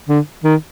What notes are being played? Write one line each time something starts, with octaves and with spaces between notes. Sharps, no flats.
D3
D#3